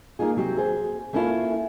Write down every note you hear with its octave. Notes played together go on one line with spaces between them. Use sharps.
A#3 D#4 F4 G#4
C3 F#3 C4 G4
G#4 C5
A3 A#3 C#4 D4 E4 F4